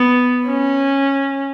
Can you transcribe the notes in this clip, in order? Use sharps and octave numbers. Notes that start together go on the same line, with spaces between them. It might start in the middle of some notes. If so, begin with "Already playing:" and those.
Already playing: B3
C#4